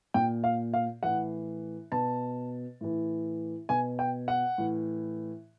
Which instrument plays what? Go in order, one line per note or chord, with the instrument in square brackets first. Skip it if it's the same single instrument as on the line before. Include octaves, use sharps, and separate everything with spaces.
[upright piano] A#2 G5
F5
F5
A2 E3 F#5
B2 A5
A2 E3
B2 G#5
G5
F#5
A2 E3